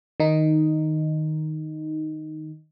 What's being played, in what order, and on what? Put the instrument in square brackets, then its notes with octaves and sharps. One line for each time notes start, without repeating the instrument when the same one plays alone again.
[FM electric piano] D#3 D#4